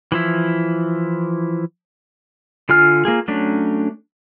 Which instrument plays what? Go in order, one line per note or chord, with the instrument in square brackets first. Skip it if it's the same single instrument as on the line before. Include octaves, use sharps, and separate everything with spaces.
[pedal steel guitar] E3 F3 E4
D3 F4 G#5 F6
A#3 F4 G#4
F#3 A3 C#4 D4